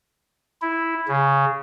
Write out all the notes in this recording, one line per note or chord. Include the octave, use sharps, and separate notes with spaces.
E4
C#3